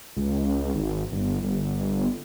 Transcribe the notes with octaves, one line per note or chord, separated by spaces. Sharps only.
C#2
G#1
G1
G1